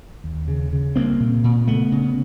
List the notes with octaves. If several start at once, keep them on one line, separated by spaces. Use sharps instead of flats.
D#2
C#3
C#3
C2 A#3 C4
A#2
A#2
C#3 A3 B3
C#3